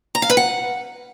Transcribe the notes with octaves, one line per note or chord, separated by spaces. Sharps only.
A#5
F5
B4
F#5